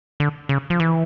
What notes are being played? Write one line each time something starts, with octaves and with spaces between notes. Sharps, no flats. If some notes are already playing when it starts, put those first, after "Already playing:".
D3
C#3
F3
E3